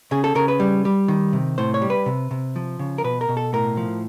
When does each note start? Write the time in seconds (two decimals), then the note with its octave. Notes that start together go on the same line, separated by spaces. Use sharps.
0.11 C#3 G#4
0.24 A4
0.35 C#3 A#4
0.48 B4
0.60 G3
0.85 G3
1.08 D#3
1.33 C3
1.58 A2 C5
1.74 C#5
1.82 G3
1.90 B4
2.06 C3
2.31 C3
2.56 F3
2.79 C#3
2.98 A#4
3.04 B2 B4
3.21 A#4
3.29 B2
3.37 A4
3.53 A2 A#4
3.77 F3